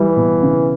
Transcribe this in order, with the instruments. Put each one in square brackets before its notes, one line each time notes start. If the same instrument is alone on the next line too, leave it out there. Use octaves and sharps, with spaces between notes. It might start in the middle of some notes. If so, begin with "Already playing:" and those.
Already playing: [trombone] E3 [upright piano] G3
[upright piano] B2
C#3